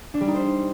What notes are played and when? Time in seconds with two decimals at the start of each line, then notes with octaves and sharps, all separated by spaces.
0.14 D4
0.21 G3
0.28 D#4
0.35 C5